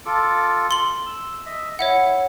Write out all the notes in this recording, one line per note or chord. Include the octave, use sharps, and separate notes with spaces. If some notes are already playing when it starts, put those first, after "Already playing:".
F4 A4 D6
C6 F#7
E6
D#5 E5
E4 C#5 E5 F#5